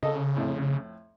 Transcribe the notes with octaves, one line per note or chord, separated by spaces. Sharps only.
C#3 A4 D#5
F2 A2